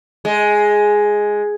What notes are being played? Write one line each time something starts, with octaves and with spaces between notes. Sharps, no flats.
G#3